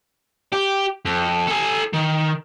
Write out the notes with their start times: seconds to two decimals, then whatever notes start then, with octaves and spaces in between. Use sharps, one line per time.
0.53 G4
1.05 F2
1.47 A4 G#5
1.94 D#3